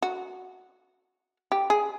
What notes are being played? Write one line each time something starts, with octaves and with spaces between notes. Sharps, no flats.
F#4
G4
G#4